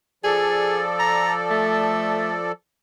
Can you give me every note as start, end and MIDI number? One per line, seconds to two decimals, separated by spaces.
0.24 2.52 53
0.24 0.82 68
0.24 2.52 69
0.24 2.52 74
0.99 1.32 82
1.50 2.33 57